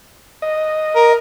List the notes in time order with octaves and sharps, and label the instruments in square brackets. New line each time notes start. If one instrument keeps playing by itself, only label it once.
[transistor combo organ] D#5
[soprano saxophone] A#4